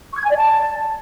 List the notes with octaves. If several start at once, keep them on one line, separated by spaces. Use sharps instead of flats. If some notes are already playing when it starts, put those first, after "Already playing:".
C#6
G#6
G#5
D5
A5